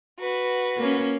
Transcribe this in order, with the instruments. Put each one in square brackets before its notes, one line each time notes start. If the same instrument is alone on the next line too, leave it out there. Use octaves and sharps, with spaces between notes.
[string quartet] F#4 B4
[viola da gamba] A#3 C#4